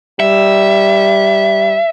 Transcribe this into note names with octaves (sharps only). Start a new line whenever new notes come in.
G3 E5